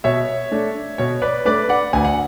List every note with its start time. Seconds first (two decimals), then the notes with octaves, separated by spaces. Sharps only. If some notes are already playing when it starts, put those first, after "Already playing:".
0.04 B2 C#5 E5
0.52 A3 D4
0.98 B2 C#5
1.22 B4 D5
1.45 A3 D4 B4 D5
1.69 D5 F#5
1.93 D2 G#5
2.05 F#5